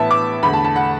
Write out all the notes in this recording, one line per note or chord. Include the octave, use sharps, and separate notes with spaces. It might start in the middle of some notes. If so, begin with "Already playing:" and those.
Already playing: A2 E3 B3 E5 A5
D6
E2 D3 A3 B5
A5
A5
F#5